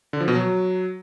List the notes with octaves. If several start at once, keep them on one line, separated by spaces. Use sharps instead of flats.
D3
F3
B2
F#3